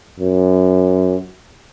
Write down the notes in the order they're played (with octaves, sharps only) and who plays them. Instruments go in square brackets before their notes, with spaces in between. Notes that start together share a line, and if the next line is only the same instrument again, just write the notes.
[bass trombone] F#2